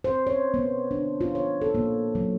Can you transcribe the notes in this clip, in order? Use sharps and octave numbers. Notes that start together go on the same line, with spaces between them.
C5
C#5
B3
D4
F4
C#5
A4
A#3
F#3